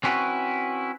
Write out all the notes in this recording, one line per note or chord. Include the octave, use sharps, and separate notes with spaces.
C4 C#4 E4 F#4 A4 B4